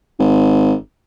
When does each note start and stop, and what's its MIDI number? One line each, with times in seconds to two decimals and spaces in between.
0.19 0.74 32